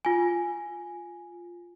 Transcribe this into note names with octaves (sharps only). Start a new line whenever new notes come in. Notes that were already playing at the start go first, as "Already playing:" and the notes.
F4 G#5